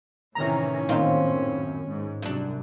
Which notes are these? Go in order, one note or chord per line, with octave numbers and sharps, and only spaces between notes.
A2 C3 D#3 E3 C#4 A#5
F#2 A#2 D#3 C4 F4
G#2
C2 F#2 D4